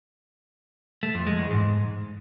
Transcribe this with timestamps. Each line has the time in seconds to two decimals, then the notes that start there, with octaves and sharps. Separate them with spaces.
1.03 A3
1.15 F2
1.27 G#3
1.39 E2
1.50 G#2